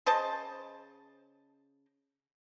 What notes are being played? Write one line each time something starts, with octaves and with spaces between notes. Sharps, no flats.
C#3 C5 D#5 A5